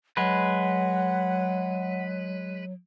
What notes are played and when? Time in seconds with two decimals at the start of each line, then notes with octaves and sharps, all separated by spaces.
0.17 F#3 G#3 B4 F#5